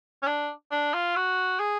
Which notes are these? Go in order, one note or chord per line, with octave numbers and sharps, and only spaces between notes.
C#4
D4
D4
F4
F#4
G#4